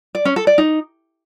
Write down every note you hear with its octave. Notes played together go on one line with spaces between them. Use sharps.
D5
C#4
A4
D5
D#4